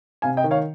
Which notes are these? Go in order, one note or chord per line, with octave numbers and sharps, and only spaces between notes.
C3 F5 G#5
D#5 G5
D#3
C#5 F5